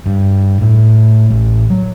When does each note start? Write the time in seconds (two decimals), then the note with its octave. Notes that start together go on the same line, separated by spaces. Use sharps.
0.06 G2
0.61 A2
1.30 A1
1.70 F#3